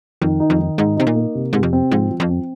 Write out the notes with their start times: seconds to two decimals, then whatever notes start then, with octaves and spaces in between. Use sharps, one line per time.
0.21 F2 D#3
0.40 D#4
0.50 F2
0.59 D#3
0.78 G#2 D#4
0.97 C3 D#4
1.07 A#2
1.15 A#3
1.35 C3
1.53 G#2 C3
1.63 F2
1.73 C4
1.91 G#2 F3
2.10 F3
2.20 F2
2.29 C4